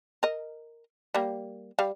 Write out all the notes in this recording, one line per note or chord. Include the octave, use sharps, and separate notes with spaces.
A#4 D#5
G3 A#3
G3 F5